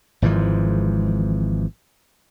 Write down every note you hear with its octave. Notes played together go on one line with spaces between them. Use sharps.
G#1 G#2 E3 F3